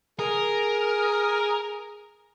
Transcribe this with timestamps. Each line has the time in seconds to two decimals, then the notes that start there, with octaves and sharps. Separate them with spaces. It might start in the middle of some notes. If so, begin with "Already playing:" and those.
0.19 G#4 A#4